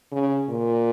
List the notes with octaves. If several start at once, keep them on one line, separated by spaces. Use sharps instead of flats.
C#3
A#2